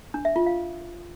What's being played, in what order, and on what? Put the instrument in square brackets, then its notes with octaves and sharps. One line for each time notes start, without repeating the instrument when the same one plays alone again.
[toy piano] D4
E5
F4
F5